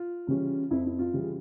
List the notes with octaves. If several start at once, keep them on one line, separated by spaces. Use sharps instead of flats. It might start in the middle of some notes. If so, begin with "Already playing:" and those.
Already playing: F4
C#3 E3 G3 C#4
F2 E4
E4
F4
C#3 E3 G3 C#4
G#4